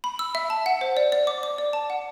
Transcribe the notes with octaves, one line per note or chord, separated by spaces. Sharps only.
B5
E6
E5
A5
F#5
C5
D5
D5
D6
D6
D5
A5
F#5